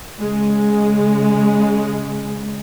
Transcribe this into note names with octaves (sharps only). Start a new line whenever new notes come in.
C#3 G#3